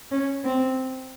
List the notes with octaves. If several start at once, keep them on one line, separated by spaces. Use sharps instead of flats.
C#4
C4